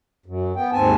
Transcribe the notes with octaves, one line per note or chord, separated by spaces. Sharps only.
F#2
B3 G5
D#2 G#2 C4 G#5 A5